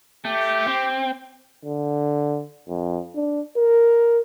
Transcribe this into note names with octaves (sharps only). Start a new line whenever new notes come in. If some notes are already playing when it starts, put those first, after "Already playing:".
A3 G4
C4
D3
F2
D4
A#4